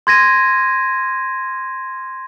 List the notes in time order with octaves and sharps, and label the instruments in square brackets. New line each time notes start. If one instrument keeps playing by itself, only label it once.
[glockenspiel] C6 G#6 A#6 D#7